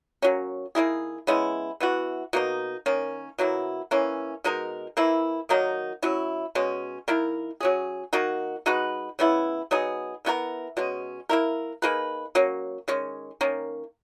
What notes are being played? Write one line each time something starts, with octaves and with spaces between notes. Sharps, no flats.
F#3 A#3 C#4
D#3 A#3 E4 G#4
C#3 G#3 B3 E4
E3 B3 F#4
B2 A#3 D#4
D#3 A#3 C#4
B2 F#3 A#3 E4
E3 A#3 C#4
B2 G#3 D#4 A#4
E3 A#3 E4
D#3 F#3 A#3 D#4
F#3 C#4 E4
B2 G#3 C#4
D#3 A#3 E4 A#4
F#3 C#4 G#4
D#3 A#3 D#4 F#4
G#3 D#4 F#4 B4
C#3 E3 B3 E4
F#3 B3 D#4 G#4
E3 B3 F#4 A#4
B2 G#3 C#4
A#3 E4 A#4
A#3 D#4 G#4 B4
F#3 A#3 C#4
D#3 G#3 C#4
D#3 A#3 C#4